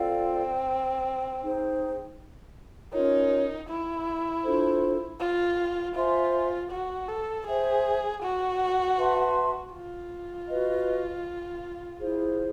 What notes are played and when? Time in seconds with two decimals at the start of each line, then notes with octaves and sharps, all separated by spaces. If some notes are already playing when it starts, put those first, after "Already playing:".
Already playing: C4 F4 A4 D5 F5
1.42 D#4 G#4 C5
2.93 C#4 D#4 F4 A#4 C#5
3.69 E4
4.44 D4 F4 A4 C5
5.20 F4
5.95 F4 C5 E5 G#5 C6
6.71 F#4
7.08 A4
7.47 G#4 C5 E5 G5
8.22 F#4
8.97 B4 E5 A5 C6
9.73 F4
10.48 F#4 B4 D#5
12.00 E4 G#4 C5